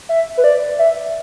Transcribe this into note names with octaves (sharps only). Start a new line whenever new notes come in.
E5
B4
D5
E5